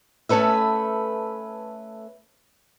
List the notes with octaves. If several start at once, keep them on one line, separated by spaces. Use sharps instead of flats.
A3 C#4 A4 B4 E5